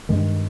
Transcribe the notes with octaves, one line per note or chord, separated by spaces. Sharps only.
G2 D#3 G#3